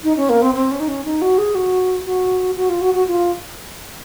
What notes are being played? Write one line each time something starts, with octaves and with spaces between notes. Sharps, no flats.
D#4
C#4
A#3
C4
C4
C#4
D#4
C#4
D#4
F#4
G#4
F#4
F#4
F#4
F4
F#4
F#4
F4